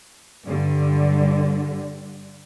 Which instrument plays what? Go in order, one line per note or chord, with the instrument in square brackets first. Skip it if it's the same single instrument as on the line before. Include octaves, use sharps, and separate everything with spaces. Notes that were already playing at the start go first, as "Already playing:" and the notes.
[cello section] G2 D3 G3